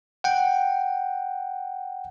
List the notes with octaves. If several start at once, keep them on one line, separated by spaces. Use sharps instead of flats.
F#5 G5